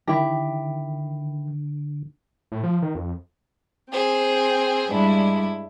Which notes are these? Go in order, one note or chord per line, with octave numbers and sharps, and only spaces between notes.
D3 D#3 E4 G4
A2
F3
D#3
F2
C4 G#4 C5
G2 G3 G#3 D4 E4